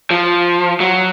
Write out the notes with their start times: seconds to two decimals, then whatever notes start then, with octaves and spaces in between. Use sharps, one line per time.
0.11 F3
0.80 F#3